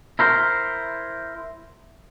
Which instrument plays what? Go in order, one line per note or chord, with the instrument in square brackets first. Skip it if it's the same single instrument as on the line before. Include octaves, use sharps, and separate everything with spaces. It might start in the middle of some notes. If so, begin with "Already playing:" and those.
[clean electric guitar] E4 A#4 C5